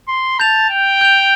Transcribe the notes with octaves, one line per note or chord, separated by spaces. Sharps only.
C6
A5 G6 F7
G5
G6 F7